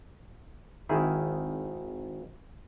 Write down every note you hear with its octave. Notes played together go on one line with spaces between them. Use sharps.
G#1 D#3 E4 G#4